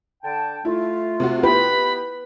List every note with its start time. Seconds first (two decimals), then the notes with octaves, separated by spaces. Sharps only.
0.23 D3 G5 A5
0.65 A3 E4 F4
1.20 C3 F#4
1.43 B3 E4 G4 B4 B5